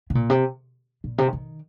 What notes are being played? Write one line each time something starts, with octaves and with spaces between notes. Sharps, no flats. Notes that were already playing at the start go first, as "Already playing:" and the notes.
C3
A#2
C3
A#2
C3
D#3